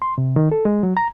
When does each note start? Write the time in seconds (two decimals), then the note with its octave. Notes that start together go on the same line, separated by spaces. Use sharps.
0.02 C6
0.18 C3
0.36 D#3
0.52 A4
0.65 G#3
0.83 F#3
0.97 A#5